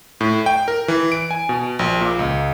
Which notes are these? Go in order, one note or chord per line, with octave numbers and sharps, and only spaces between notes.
A2
G5
A#4
E3
D7
G#5
B2
A#1
A#2
C#2